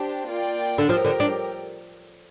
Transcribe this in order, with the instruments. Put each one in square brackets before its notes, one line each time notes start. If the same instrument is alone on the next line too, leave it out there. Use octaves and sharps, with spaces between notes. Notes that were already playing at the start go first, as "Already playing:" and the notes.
Already playing: [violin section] D4 G4 C5
A#3 F4 D5 G5
[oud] D3
[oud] F3 [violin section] G4 A#4 G5
[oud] D3
D4